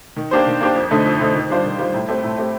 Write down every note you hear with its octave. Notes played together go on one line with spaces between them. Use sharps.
D#3
A#3 D4 G4 C5
D#3
A#3 D4 G4 C5
F2
D3 A3 D#4
F2
D3 A3 D#4
D#3
G3 D4 F4 C5
D#3
G3 D4 F4 C5
A2
A3 C4 G4
A2
A3 C4 G4